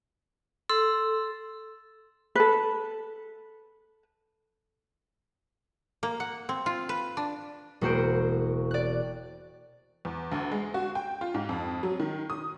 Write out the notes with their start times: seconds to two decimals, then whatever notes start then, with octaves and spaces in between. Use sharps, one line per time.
0.69 A4 C6 E6
2.35 A4 B4
6.03 A#3
6.20 F#5
6.49 C4
6.66 F4
6.89 B4
7.17 D4
7.81 E1 A#3 F#4 C5 D7
8.71 D5 F#6
10.05 E2
10.32 D2
10.52 G#3
10.74 F#4
10.95 G5
11.21 F4
11.34 G#2
11.49 F2
11.83 F#3
12.00 D#3
12.30 D#6